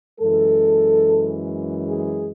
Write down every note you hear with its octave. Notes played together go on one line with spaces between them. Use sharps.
F#2 E3 G#3 A4
G#4